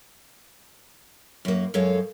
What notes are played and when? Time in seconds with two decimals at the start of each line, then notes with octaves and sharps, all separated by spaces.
1.45 F#2 A#3
1.74 F#2 G#3 A4 C#5 F5